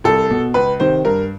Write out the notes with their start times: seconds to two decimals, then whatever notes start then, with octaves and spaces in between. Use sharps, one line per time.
0.04 C2 A4
0.30 B2
0.54 C#2 B4
0.80 C3 D#3 C5
1.05 G2 A#4